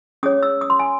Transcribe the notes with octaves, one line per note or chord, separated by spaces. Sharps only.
C#4 G#4 C#5 D#6
E6
D#6
C6
G#5